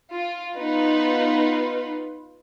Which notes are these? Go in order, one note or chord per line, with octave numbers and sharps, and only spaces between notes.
F4
B3 D#4 F4 B4